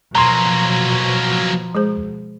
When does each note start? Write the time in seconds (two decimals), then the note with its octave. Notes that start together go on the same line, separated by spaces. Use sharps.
0.15 B2 F3 F#3 A#3 A#5 C6
1.75 G#3 G#4 C5